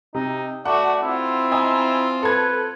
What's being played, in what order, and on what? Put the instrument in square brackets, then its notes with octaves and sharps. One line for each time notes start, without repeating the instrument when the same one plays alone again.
[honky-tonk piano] C3 [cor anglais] D#4
[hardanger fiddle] A3 F#4 [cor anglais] D5 [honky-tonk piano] F#5
[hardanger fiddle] C4 F4 [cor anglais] E4
[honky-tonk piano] D#5 G#5 A#5
[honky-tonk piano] A4 G#6 [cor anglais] B4